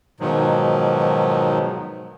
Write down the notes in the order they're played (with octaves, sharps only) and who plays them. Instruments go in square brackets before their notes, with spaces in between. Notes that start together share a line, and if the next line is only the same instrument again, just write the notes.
[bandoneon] G#2 B2 D#3 F3 F#3